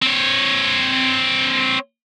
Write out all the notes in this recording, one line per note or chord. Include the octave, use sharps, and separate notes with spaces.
C4 C#5